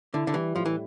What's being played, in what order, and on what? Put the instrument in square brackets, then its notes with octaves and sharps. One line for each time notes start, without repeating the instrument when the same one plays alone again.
[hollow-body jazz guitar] D3 [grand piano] E4
[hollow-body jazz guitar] D3
[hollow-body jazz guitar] E3 [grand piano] G3
[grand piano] A2 [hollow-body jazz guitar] F3
[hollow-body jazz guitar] E3